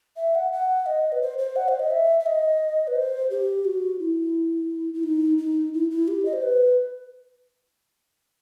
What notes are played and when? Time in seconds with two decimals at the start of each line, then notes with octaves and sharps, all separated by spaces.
0.17 E5
0.35 F#5
0.52 F#5
0.86 D#5
1.12 B4
1.22 C5
1.38 C5
1.56 F#5
1.68 C5
1.80 D#5
1.91 E5
2.20 E5
2.26 D#5
2.88 B4
2.96 C5
3.30 G4
3.65 F#4
4.00 E4
4.94 E4
5.04 D#4
5.38 D#4
5.74 E4
5.91 E4
6.08 G4
6.25 D#5
6.33 C5
6.43 B4